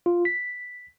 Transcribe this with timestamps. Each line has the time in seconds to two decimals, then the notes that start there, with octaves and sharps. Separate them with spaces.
0.06 F4
0.25 B6